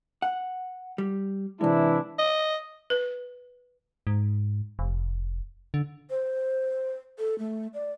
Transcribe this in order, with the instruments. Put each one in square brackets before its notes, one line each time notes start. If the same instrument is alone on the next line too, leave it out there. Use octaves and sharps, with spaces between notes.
[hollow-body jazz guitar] F#5
G3
[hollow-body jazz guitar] C3 G#3 [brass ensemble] E3 D4 E4
[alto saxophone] D#5
[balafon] B4
[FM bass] G#2
F1
D3
[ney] C5
A4
A3
D5